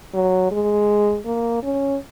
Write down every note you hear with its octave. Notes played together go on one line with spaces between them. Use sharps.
F#3
G#3
A#3
C#4